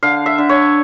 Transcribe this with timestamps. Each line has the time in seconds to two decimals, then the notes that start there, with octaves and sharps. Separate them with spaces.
0.03 D3 F5
0.26 E5
0.38 D3
0.49 C#5